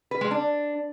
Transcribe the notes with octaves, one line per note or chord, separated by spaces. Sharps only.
B4
G#3
D4